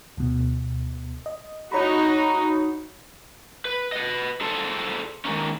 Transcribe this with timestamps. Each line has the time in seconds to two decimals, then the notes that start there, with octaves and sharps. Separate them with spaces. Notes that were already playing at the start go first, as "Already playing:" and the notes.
0.17 D2 B2
1.26 D#5
1.72 D#4 F#4 C#5 A#5 B5
3.65 B4
3.92 B4 D#5
4.41 G#4 A4 C5 D5 A5
5.25 D#3 G#3 A#3 C#4